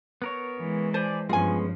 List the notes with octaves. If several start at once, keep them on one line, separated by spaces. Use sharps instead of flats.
B3 A#4 C#5
E3 G#3
C5 D5 G#5 A5
G2 F3 G#3 B3 C#4 F4 G#5